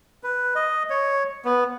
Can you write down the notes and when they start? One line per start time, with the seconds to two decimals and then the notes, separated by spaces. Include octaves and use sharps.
0.23 B4
0.55 D#5
0.90 C#5
1.45 B3